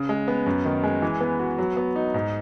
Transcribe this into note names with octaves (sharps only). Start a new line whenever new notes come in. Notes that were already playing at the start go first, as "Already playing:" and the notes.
Already playing: C#3
G#3
B3
F#2
D#3
G#3
E3
B3
F#4
F#3
B3
D#4
G#2